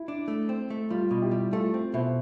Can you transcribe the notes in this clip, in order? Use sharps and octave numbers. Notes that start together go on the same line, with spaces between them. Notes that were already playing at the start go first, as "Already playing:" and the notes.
Already playing: E4
D4
A3
C4
A3
G3 F4
B2
E4 G4
G3
A3 F4 A4
C4
B2 C5 E5